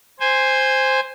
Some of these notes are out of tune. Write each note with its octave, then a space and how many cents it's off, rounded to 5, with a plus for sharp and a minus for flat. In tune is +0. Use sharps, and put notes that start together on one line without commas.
C5 +0 G#5 -15